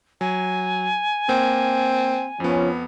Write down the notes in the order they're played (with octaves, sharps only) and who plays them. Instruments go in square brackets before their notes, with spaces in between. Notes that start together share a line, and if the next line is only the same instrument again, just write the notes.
[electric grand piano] F#3 [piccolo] G#5
[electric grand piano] A#3 [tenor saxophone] C4
[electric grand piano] F2 B3 [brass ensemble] F3 C#4